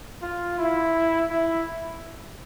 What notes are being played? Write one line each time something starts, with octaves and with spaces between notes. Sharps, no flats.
F4
E4
E4